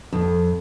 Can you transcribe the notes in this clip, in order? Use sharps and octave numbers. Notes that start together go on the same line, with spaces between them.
F2